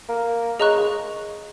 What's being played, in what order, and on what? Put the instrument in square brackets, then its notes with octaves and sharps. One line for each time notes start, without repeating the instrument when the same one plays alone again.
[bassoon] A#3
[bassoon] C#3 [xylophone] G#4 D#5 A#5 C#6 F#6
[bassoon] G#3